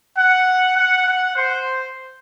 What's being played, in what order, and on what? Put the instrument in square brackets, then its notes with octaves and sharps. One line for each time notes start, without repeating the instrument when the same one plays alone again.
[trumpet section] F#5
F#5
F#5
C5